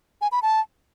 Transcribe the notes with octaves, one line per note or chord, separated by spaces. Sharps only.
G#5
B5
A5